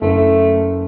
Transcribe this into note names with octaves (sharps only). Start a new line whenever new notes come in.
F#1 A3